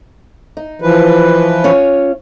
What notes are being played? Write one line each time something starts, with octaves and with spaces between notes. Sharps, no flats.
D#4
E3 F3 B4
C#4 F4 C#5